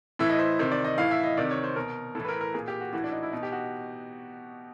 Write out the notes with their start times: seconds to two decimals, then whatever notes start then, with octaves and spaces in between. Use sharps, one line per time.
0.19 A2 E3 E5
0.30 D#5
0.39 C5
0.59 C3 D#3 C5
0.72 D5
0.84 D#5
0.98 A2 E3 F5
1.11 E5
1.24 D#5
1.37 C3 D#3 D5
1.51 C#5
1.64 C5
1.76 B2 A#4
2.15 A2 E3 A4
2.25 B4
2.28 A#4
2.41 A#4
2.54 A#2 G#4
2.68 G4
2.81 F#4
2.93 A2 E3 F#4
3.04 D4
3.12 D#4
3.23 E4
3.33 B2 D#4
3.43 G4
3.52 F#4